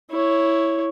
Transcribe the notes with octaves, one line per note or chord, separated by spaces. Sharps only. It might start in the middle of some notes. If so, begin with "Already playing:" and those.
E4 C#5